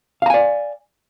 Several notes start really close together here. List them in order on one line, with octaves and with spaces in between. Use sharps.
F5 A#5 G#5 D5